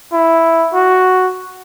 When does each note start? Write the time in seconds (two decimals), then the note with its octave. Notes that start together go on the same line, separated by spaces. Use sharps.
0.13 E4
0.74 F#4